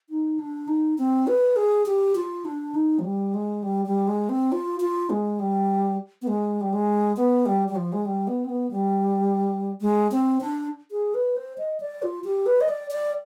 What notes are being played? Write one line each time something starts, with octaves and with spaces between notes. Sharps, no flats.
D#4
D4
D#4
C4
B4
G#4
G4
F4
D4
D#4
F3
G3
G#3
G3
G3
G#3
C4
F4
F4
G#3
G3
B3
G#3
G3
G#3
B3
G3
G3
F3
G#3
G3
B3
C4
B3
G3
G#3
C4
D4
G#4
B4
C5
D#5
D5
F4
G4
B4
D#5
D5
D5